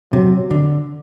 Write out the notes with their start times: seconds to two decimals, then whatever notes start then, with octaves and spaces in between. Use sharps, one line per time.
0.13 C3 F#3
0.51 D3